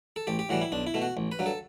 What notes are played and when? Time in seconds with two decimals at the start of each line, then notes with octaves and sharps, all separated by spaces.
0.16 A4
0.27 A1 G4
0.39 G4
0.49 A2 E3 G3 F#4
0.61 E4
0.72 B1 D4
0.87 E4
0.94 B2 A3
1.02 F#4
1.17 A1
1.32 B4
1.39 G2 F#3
1.46 A4